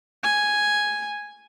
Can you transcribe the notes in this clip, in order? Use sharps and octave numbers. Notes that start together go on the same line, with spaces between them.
G#5